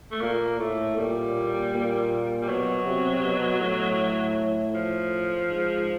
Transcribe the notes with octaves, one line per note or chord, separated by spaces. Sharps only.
A3
A#2 A#3
A2 A3
A#2 G3
A#2
G3
B2 F#3
C3
B2
A2
F3
G#2